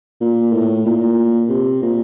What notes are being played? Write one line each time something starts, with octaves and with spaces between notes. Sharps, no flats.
A#2
A2
A#2
C3
A#2